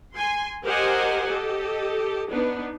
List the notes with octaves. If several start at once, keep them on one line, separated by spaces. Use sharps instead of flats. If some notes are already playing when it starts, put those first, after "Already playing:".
G#5 C6
G4 A#4 C5 D#5 F#5 G#5
G4 A4 D#5
B3 D4 D#4